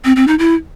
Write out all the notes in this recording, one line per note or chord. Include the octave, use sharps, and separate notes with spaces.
C4
C4
D#4
E4